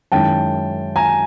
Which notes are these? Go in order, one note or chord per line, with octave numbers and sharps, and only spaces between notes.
F#2 D#3 G#3 C#4 E4 G5 A5
G#5 A#5